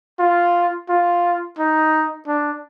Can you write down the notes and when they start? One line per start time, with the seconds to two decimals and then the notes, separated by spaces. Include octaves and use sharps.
0.19 F4
0.89 F4
1.59 D#4
2.27 D4